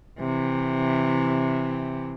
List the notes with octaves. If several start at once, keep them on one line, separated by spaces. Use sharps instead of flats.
C3 E3